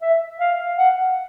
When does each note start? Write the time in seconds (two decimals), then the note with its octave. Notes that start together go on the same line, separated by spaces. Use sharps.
0.02 E5
0.40 F5
0.78 F#5